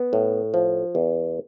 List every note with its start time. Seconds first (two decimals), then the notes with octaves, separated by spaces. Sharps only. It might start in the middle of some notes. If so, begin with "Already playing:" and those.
Already playing: B3
0.13 A2
0.54 F3
0.95 E2